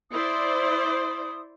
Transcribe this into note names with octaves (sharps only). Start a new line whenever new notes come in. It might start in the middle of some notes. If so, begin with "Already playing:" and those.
E4 C5 D5 D#6